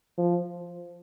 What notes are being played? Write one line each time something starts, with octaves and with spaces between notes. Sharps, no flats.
F3